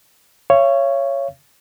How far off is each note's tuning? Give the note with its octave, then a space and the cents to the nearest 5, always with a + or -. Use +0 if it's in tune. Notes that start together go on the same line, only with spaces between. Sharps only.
C#5 +0 F5 -45